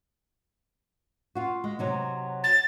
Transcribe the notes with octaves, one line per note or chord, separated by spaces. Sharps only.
F4 F#4
G#3
C3 F#3 D#4
A6